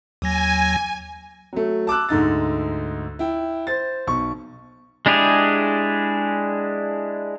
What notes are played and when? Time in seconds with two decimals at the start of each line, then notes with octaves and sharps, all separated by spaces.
0.22 D#2 F#3 G#5 A#6
1.53 F#3 A3
1.87 A5 D6 E6 F#6
2.09 D2 G#2 D#4 A6
3.19 E4 G5
3.67 C5 A6
4.07 B1 C#6
5.06 G#3 D4 E4 G4 G#4